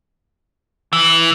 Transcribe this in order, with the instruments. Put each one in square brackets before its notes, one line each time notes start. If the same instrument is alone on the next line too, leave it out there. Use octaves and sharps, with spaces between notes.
[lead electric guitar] E3